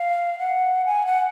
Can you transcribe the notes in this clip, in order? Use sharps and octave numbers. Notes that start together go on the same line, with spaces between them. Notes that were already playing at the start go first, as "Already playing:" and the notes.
Already playing: F5
F#5
G#5
F#5